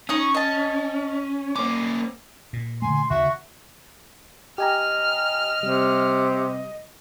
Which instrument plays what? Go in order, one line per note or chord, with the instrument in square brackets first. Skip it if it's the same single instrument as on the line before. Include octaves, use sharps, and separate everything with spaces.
[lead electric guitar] C#4 [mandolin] D#4 C#6 D#6
[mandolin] D#5 A5
[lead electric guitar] A#3 C#4 [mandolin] D6
[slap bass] A#2
[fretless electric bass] D3 D#3 A3 [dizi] G#5 [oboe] C6
[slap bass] D#2 [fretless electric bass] C#3 [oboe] F#4 [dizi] E5
[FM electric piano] G4 G#5 A#5 [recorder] D#5 [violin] F6
[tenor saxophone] C3 [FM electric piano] G3